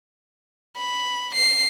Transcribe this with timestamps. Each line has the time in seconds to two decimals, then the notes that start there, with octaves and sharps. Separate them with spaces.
0.76 B5
1.34 C7